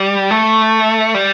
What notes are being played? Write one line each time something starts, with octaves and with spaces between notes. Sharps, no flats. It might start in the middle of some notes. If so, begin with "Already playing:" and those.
Already playing: G3
A3
G3